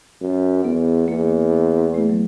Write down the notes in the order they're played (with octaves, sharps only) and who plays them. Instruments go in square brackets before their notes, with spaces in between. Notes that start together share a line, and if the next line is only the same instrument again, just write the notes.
[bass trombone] F#2
[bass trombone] E2 [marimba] B3
[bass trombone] E2 [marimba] A#3
[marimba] A3
F#3